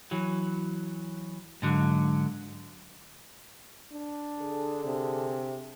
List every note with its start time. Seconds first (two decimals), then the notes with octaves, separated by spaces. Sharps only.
0.11 E3 F#3
1.62 G#2 D3 F#3
3.92 D4
4.39 D3 G#4 A4
4.85 C3